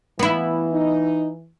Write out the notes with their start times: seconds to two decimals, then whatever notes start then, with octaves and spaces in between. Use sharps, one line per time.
0.19 E3 B3 E4
0.72 D#4